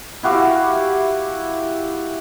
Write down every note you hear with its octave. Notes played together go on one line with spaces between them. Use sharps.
E4 F#4 G4 F5